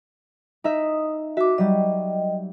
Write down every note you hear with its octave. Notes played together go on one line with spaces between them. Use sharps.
D#4 E5 D#6
F#4 E5 D6
F#3 G3 D#5 G5